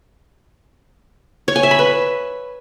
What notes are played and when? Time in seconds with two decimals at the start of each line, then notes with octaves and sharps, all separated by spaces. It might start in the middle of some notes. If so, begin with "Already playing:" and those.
1.48 C#5
1.56 G#5
1.63 E5
1.71 B5
1.79 B4